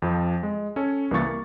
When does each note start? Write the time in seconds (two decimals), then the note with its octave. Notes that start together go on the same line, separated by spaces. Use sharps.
0.02 F2 F3
0.43 G#3
0.76 C#4 A4 C#5
1.11 C2 E3 A#3 F4 C#6 A6
1.27 A#3